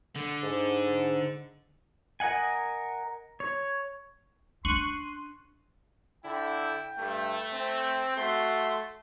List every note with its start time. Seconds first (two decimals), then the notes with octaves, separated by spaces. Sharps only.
0.16 D3
0.43 G#2
2.20 A#4 D#5 F#5 G#5
3.40 C#5
4.65 C#4 D4 C6 C#6 F#6 D#7
6.24 D3 E4 G5
6.98 G2 A3
7.53 C4
8.17 A3 F#4 C6